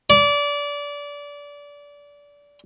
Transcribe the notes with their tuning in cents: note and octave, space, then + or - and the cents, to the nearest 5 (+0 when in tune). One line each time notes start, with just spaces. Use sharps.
D5 -25